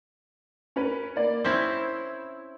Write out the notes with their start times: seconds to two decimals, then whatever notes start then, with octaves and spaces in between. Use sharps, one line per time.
0.76 C#4 A#4 B4
1.16 A#3 D5
1.44 C4 C#4 E4 G6